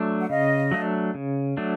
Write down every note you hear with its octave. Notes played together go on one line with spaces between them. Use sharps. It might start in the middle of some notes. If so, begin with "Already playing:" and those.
Already playing: F#3 A3 D4
F#5
C#3 D#5 F5
F#3 A3 D4
C#3
F#3 A3 D4